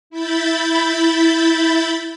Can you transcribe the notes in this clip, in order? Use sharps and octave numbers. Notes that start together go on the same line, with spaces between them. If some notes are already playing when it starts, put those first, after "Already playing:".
E4 B5 G6 A6